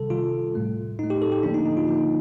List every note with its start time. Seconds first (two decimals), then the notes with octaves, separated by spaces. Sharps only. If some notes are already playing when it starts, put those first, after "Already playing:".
Already playing: C3 D#3 G3 A4
0.10 C3 D#3 G3 F4
0.55 A2 A3
0.99 A2 A3 D#4
1.10 G4
1.22 A4
1.32 G4
1.43 D3 F3 A#3 D4
1.54 D#4
1.66 D#4
1.77 F4
1.87 D3 F3 A#3 D#4